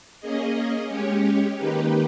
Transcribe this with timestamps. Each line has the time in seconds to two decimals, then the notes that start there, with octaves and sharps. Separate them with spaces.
0.21 A#3 C#4 G#4 D#5
0.89 G#3 C#4 G4 C#5
1.57 D#3 A#3 D#4 G4 B4